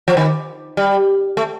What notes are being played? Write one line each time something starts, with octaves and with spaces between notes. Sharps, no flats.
F3
D#3
G3
A3